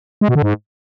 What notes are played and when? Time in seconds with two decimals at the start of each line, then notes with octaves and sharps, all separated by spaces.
0.21 G#3
0.28 B2
0.35 D3
0.42 G#2